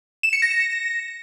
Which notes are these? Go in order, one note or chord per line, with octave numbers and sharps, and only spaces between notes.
E7
C#7
A#6